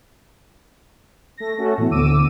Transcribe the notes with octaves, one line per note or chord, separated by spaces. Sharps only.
A3 A#6
A3 C#4 F#4 A4
A2 E3 B3
D2 D6 E6 D#7